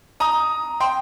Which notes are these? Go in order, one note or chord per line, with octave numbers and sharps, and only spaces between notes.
A#5 D#6
G5 C6